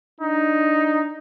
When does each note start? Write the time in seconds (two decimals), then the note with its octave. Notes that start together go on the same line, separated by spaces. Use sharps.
0.21 D4 D#4